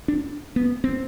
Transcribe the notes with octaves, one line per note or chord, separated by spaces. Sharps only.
D4
B3
C4